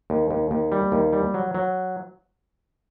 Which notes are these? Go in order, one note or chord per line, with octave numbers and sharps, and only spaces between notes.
D#2
D#2
D#2
G3
D#2
G3
F#3
F#3